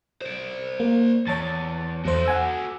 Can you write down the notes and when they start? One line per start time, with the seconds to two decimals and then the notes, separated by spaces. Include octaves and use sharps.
0.21 C5 D5
0.80 A#3
1.27 E2 C#5 A5 A6
2.05 E2 F#4 A4 C5
2.26 F#5 G#5 E6